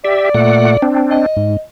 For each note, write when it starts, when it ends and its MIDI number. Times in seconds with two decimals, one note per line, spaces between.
0.05 0.29 67
0.05 0.86 74
0.05 0.29 76
0.35 0.77 46
0.35 0.77 57
0.35 0.77 78
0.82 1.26 60
0.82 1.26 62
1.11 1.62 75
1.37 1.57 44